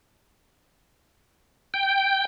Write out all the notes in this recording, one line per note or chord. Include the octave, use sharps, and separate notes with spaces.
G5